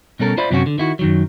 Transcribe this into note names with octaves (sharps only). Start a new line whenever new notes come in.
B2 G3 C#4 A4 A#4
F4 C5 D5 E5 B5
F#2 C3 F#3 C#4 F#4
D3
D#3 E4 F#4
F#2 D#3 F#3